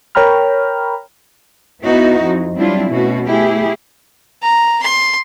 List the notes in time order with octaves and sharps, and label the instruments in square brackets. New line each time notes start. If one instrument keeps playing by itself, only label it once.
[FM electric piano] A#4 C#5 G5 A#5 B5 F6
[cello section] B3 D#4 E4 F#4
F2
F#3 G3 C4 D4 E4 F4
B2 A3 C#4 F#4
A3 E4 G4 G#4
[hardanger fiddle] A#5
C6